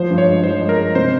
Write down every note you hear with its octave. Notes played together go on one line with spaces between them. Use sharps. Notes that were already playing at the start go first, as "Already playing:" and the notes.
Already playing: F3 C5
G2
C#5
G#3
F3 C5
G#3
A#4
G#3
C3 C5